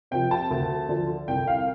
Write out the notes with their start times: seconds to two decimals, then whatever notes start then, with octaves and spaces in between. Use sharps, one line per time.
0.11 C3 F3 G5
0.31 A5
0.50 D2
0.89 D3 F3
1.28 C2 G5
1.47 F5